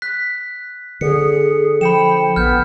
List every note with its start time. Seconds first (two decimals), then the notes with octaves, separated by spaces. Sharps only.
0.02 F#6 B6
1.01 D3 G#4 C#7
1.81 F3 G5 B5 C#7 E7
2.36 A#1 B3 F6 G6